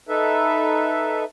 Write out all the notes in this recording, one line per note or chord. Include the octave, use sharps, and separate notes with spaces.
D#4 A4 B4 E5